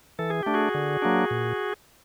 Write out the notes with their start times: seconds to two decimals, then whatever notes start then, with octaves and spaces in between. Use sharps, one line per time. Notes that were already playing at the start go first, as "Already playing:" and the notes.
0.19 E3 A4
0.30 G#4
0.43 A3 D4 G4
0.54 F#4 G#4
0.75 D3
1.02 F#3 A#3 D4
1.31 A#2